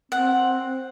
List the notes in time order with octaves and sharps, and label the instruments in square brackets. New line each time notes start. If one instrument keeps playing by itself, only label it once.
[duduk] C4 [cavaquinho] F#5